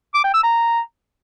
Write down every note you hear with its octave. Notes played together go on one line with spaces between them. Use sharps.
D6
G5
E6
A#5